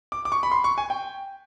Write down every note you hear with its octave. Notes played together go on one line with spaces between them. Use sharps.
D6
D6
C#6
B5
C6
C#6
G#5
G5